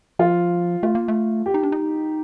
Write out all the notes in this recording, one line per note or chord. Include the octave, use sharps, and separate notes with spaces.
F3 F4
A3 F4
A#3
A3
G4
D#4
D4
D#4